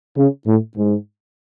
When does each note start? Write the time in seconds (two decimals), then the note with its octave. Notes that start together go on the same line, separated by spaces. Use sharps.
0.17 C#3
0.46 A2
0.76 G#2